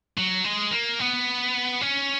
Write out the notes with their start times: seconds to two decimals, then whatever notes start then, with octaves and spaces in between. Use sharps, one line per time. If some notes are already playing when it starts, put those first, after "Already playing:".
0.17 F#3
0.44 G#3
0.71 A#3
1.00 B3
1.81 C#4